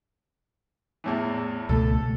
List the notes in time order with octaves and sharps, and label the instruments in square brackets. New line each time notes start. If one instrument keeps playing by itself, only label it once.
[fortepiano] E2 A2 E3
[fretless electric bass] C#2 B2 A3 [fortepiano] A4